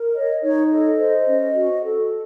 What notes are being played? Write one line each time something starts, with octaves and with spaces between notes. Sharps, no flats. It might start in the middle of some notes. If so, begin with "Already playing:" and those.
Already playing: A#4
C#5 D#5
D#4 C#5
A4 D#5
C5
C#4
F#4
A4